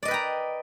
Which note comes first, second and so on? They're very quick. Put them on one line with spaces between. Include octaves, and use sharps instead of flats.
D5 D#5 B4 G5 A#5